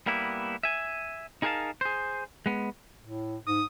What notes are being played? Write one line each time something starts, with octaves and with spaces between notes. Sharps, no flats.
G3 A#3 B3 E4
E5 G#5
D#4 G#4 A#4 C5 F5 A5
G#4 C5
G#3 B3
A2
G#2 D#6